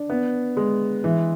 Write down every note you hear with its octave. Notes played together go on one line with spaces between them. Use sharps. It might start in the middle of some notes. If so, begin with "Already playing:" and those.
Already playing: D4
B3
G#3
E3